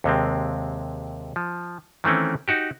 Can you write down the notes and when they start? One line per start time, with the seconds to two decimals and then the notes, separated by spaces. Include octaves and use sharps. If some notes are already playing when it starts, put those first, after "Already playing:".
0.04 D#2 C3 G#3 C4
1.36 F3
2.04 D#3 E3 A3 C4 C#4
2.48 D#4 F#4 G4